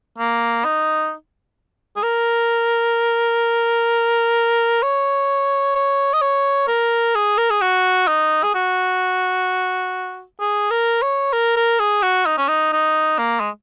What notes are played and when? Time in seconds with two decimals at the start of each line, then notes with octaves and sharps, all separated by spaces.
0.18 A#3
0.65 D#4
1.97 G#4
2.03 A#4
4.83 C#5
5.75 C#5
6.14 D#5
6.21 C#5
6.68 A#4
7.15 G#4
7.38 A#4
7.50 G#4
7.62 F#4
8.08 D#4
8.43 G#4
8.55 F#4
10.41 G#4
10.71 A#4
11.02 C#5
11.33 A#4
11.57 A#4
11.80 G#4
12.03 F#4
12.26 D#4
12.38 C#4
12.48 D#4
12.73 D#4
13.19 A#3
13.40 G#3